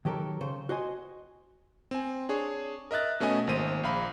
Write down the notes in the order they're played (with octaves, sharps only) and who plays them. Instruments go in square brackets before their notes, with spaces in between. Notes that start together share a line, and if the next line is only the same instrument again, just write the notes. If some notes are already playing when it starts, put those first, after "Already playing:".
[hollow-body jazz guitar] D#3 F#3 G4 A4 A#4
C#3 C5
F#4 C5 D#5 G#5
[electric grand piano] C4 G#5
D4 G#4 C#5
A#4 D#5 E5 F#6 A6
B2 A3 C#4 D#5 G#5 D#6
G#1 A#3 C5 D#7
A#1 F5 B5